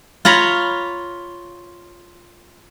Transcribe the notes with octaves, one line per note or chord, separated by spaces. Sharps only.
F4 C#5 A#5 B5